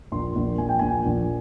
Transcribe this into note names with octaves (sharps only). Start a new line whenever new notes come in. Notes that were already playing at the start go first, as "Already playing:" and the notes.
A#1 C6
A#1
A#1 G#5
G5
A#1 G#5
A#1